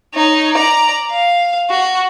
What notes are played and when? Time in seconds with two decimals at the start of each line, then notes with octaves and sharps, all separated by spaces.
0.14 D#4 C#5
0.54 D5 A#5
1.11 F5
1.70 F#4